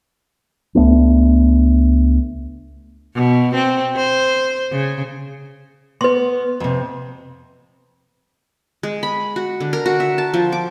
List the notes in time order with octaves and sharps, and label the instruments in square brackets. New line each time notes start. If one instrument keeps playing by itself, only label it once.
[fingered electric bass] C#2 A3 B3 D4
[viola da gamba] B2
C4
C5
C#3
[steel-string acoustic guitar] B3 [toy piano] B4 C6
[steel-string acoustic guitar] F2 C3
[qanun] G#3
B5
F#4
D3
A#4
F#4
E5
A5
F3
D6